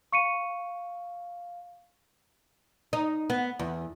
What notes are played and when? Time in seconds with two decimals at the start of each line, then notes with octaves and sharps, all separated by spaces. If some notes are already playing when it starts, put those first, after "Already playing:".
0.12 F5 C#6 C#7 D#7
2.93 D#4
3.30 B3
3.59 E2